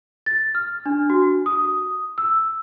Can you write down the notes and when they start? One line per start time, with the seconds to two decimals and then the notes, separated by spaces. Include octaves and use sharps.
0.26 A6
0.55 F6
0.86 D4
1.10 F#4
1.46 D#6
2.18 E6